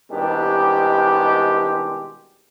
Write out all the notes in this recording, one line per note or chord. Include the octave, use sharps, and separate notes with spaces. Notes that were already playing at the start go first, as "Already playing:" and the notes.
C2 B2 D#3 G#3 D4 G4